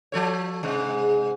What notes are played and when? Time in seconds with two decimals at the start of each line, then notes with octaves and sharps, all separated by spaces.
0.12 F3 A4 C#5
0.63 G#2 C3 G#3